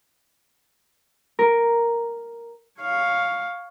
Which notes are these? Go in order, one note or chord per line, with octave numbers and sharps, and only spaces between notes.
A#4
C#5 F5